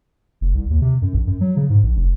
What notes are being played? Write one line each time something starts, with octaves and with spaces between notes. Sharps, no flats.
F1
C2
D#2
C3
F#2
A#1
F#2
F#3
C#3
G#2
A#1
F1